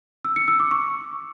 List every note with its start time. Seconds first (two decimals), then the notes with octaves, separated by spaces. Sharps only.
0.25 E6
0.36 C#7
0.48 E6
0.60 D6
0.71 C#6